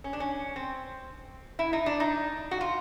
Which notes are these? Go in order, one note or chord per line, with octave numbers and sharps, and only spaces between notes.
C#4
D4
C#4
C4
E4
D#4
D4
D#4
F#4
F4